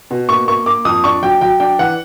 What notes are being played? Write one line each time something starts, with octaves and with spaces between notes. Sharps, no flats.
B2
A#3 C#6
A#3 C#6
A#3 D6
F2 D#6
D4 C#6
F#3 G5
F#3 G5
D4 G5
E3 F#5